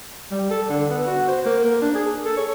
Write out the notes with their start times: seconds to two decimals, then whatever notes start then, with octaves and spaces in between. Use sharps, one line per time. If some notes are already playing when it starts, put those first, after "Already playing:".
0.31 G3
0.51 A4
0.69 D3
0.89 B3
1.06 F#4
1.28 C5
1.45 A#3
1.65 A#4
1.82 D4
1.95 G#4
2.25 A4
2.37 C#5